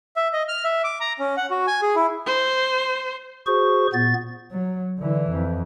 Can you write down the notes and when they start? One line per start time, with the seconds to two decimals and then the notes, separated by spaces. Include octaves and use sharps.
0.16 E5
0.33 D#5
0.48 F6
0.64 E5
0.84 D6
1.01 A#5
1.19 C#4
1.37 F#5
1.50 F#4
1.67 G#5
1.82 G#4
1.96 E4
2.27 C5
3.47 F#4 G#4 C5 C#6
3.93 A#2 B3 A6
4.51 F#3
4.98 D3 E3
5.31 F2